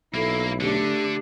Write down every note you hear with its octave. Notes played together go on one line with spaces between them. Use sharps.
B1 A#3 E4 A4
D3 A3 D4 G4